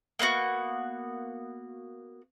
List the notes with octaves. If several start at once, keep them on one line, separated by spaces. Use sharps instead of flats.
A#3 B3 D#4 F#4